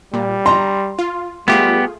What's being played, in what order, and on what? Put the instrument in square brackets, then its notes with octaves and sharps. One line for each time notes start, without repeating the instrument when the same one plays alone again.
[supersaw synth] A#2 [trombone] G3
[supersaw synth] A#5 [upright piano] C6
[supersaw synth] F4
[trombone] G3 [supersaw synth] A3 F4 G#4 [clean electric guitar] B3 G4